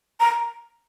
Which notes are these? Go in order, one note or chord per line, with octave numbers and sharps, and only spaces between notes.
A#5